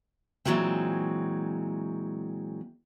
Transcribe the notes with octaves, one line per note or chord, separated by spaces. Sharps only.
A#2 E3 F#3 G#3 C4